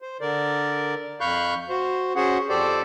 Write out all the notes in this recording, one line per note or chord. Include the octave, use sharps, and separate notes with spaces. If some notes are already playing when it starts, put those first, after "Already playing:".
C5
D3 A#4 D5
F2 F5 B5 C#6 F#6 G6
F#4 C5
C#4 F#4 G#4 C5 F#5
F2 G4 A4 C5 D5